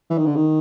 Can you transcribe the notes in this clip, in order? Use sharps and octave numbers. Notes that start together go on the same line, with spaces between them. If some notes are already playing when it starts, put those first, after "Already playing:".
E3
D#3
D3
D#3